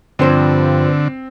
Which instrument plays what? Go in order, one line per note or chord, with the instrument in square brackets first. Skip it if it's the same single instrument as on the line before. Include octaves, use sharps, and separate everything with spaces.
[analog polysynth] G2 [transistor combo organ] D3 [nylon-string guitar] F3 C5 [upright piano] C4